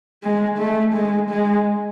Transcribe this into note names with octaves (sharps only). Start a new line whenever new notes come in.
G#3
A3
G#3
G#3